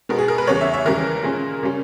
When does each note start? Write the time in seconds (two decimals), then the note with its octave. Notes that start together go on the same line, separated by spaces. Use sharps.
0.09 B2 G#3 B3 A#4
0.19 G#4
0.28 A#4
0.38 B4
0.47 E2 C#3 G3 C#5
0.61 E5
0.73 E5
0.85 D#2 C#3 E3 G3 A#4
1.23 A#2 G#3 C#4
1.63 C#3 G3 C#4